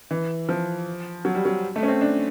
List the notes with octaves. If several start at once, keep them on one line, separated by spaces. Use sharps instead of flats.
E3
F3
F#3
G3
F#3
A3
C#4
C4
D4